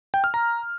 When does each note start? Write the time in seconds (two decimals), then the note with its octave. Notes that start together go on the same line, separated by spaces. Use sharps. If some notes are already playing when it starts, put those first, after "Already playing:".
0.14 G5
0.24 F6
0.34 A#5